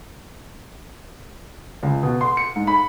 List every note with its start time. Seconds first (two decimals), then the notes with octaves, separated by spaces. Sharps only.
1.83 C#2
2.03 B2
2.21 C6
2.37 C#7
2.56 G#2
2.67 B5